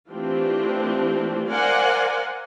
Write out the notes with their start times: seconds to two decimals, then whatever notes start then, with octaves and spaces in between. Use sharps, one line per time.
0.10 E3 A3 C4 D4 F4 G4
1.47 A#4 C5 D5 F5 F#5 G#5